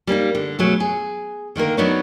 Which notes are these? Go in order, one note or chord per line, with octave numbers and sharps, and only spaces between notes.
G3 A#3 C#4 D#4
D3
B2 F#3 G#3 A3
G#4
D3 D#3 A#3 A#4
F#3 B3 D4 D#4 B4 C#5